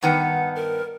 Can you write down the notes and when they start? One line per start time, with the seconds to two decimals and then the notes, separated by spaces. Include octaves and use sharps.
0.03 G2 D#3 B3 F#5
0.55 A#4